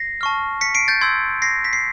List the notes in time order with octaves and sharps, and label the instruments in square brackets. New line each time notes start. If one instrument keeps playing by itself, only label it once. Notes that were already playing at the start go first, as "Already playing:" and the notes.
Already playing: [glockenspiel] A#6 C7
A5 C#6 F6
B6 C#7
C7 D7
G6 A6
C6 E6 G6 G#6
A#6 C7
B6
C7